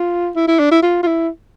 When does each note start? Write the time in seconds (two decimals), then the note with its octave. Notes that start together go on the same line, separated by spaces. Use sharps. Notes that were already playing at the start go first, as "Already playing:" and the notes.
Already playing: F4
0.36 E4
0.48 E4
0.59 D4
0.71 E4
0.83 F4
1.03 F4
1.07 E4